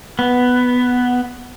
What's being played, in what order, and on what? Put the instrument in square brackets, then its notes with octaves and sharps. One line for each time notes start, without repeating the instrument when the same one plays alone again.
[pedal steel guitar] B3